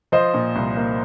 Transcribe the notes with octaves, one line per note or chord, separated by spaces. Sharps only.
F3 C5 D#5
A#2
C2
A#3